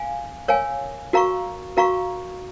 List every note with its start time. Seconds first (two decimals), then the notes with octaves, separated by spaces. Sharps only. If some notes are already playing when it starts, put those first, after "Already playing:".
Already playing: F5 G#5
0.48 A#4 C#5 F5 G#5
1.13 F#4 A#4 F5 A#5 C#6
1.77 F#4 A#4 F5 A#5 C#6